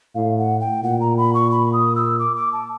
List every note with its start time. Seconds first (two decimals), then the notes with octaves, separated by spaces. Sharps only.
0.15 A2 F5
0.38 F#5
0.61 G5
0.83 A#2 F#5
1.01 A#5
1.17 B5
1.35 C#6
1.51 B5
1.73 D#6
1.96 E6
2.19 D6
2.36 D6
2.53 A5